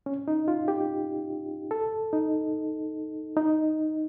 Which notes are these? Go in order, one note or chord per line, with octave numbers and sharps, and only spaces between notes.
C#4
D#4
F4
G4
A4
D#4
D#4